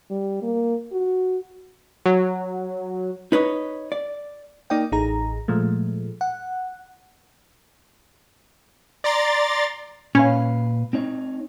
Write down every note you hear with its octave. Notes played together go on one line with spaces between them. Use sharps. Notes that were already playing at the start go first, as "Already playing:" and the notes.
G3
A#3
F#4
F#3
D#4 B4 C#5 D#5
D5
A#3 D#4 D5 D#5 G5
A1 D#4 G#4 A#5
A#2 F3 G#3 A3
F#5
D5 A#5 C6 A6
A#2 C#4 B4 F5
C4 D#4 C#5